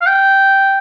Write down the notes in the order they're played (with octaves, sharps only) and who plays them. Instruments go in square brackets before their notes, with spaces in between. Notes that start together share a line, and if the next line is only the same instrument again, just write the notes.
[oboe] F5
G5